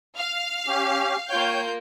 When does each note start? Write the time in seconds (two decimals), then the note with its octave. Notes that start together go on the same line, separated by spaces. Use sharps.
0.17 F5
0.67 C#4 G4
1.30 A#3 F4 C#5 G5 G6